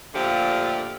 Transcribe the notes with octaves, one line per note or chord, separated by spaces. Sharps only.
A#2 D3 F3 A3 G4